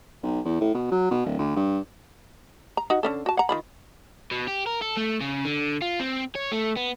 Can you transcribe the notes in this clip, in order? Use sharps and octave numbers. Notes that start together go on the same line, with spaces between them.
B1
E2
A2
B2
F#3
B2
D1
D2
G2
A#5
D#4 F#4
D3 C#4 A4
F#4 A5
F#5 A#5
D#3 F4 B5
B2
G4
A#4
A4
A3
C#3
D3
F4
C4
C#5
A3
B3